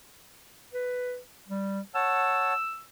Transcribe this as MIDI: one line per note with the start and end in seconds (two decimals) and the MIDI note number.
0.74 1.19 71
1.48 1.80 55
1.95 2.53 73
1.95 2.53 78
1.95 2.53 81
1.95 2.82 88